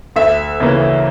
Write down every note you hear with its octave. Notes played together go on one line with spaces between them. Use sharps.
D2 E5
C#3 E3 A#3 C#4